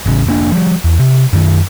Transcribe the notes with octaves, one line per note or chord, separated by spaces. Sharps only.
A1 C#3
F1 A#3 D4
F3 G3
E2
C3
F#2 D#3